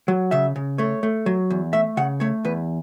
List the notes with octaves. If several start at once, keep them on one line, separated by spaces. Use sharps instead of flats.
F#3
C#3 E5
C#3
A3 C#5
A3
F#3
E2
A3 E5
C#3 F#5
A3 C#5
E2 B4